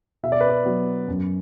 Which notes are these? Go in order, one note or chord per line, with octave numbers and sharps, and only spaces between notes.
B2 E5
D5
B4
D5
F#3 B3
F#2